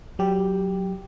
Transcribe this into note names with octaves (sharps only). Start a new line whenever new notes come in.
F#3 G4